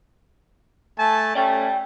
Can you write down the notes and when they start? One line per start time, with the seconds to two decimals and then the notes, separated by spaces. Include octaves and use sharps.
0.98 A3 G#5 A5
1.35 A3 C#4 D5 G5